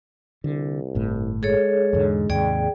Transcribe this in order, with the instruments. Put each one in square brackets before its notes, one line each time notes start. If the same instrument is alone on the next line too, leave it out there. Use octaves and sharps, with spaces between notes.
[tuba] C2 [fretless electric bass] D3
[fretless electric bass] G1 A2
[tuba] G#3 [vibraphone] G#4 A4 C#5
[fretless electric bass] E2 G#2 D3
[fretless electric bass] D#2 G#2 C3 [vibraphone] G#4 D5 G5